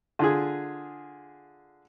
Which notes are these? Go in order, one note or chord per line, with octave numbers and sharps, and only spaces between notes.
D3 F4 G#4